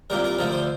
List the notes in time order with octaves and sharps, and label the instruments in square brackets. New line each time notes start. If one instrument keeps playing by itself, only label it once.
[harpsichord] C2 A#2 G3 A#4
A#4
D2 D3 F3 A#4
C5